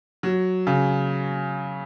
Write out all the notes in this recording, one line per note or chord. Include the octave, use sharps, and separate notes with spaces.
F#3
C#3